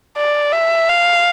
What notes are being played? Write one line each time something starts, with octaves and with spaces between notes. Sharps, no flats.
D5
E5
F5